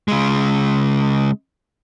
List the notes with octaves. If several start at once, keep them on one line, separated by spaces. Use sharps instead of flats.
C#3 G#3